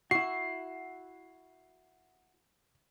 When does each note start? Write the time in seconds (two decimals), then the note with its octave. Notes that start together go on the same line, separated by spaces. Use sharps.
0.11 E4 F#4 C7